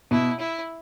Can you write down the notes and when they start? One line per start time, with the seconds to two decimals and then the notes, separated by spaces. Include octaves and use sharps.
0.11 B2 E4
0.39 E4